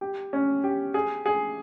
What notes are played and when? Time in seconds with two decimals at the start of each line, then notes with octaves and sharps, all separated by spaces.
0.01 G4
0.33 C#4
0.64 G4
0.94 G#4
1.26 G#4